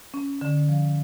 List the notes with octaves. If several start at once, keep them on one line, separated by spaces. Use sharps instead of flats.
C#4
D3
F3